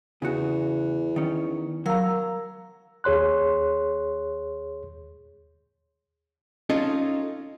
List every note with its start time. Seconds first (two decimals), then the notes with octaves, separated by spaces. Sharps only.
0.22 E2 C#3 F#4
1.16 D#3 C#4
1.86 F#3 A#4 F5 A#5 E6
3.04 D#2 G#4 C#5 C6 F#6
6.70 C#4 D#4 F4 A4 D#5